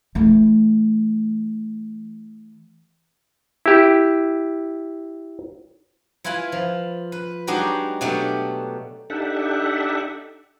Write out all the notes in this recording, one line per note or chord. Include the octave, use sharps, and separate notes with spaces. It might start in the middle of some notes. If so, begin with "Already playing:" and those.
E3 A3
E4 G4
E4 F4 B4 G#5 B5
F3
B4
F#3 G#3 D4 D#4 F#4 G4
B2 F#3 A3 D4 G4
D4 D#4 G4 A4 E5 F#5